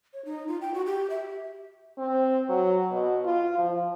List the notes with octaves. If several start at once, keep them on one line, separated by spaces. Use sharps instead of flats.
C#5
D#4
F4
G5
F#4
G4
E5
C4
F#3
B2
F4
F3